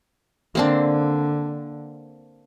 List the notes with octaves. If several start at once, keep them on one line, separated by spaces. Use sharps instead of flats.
D3 A#3 C4 D4